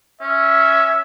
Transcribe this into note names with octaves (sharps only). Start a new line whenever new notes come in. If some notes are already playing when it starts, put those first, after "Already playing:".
C#4 E5